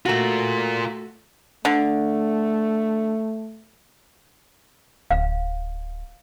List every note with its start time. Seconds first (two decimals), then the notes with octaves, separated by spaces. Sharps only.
0.06 A3 F4 F#4 A#4
1.65 D3 A3
5.11 D1 F5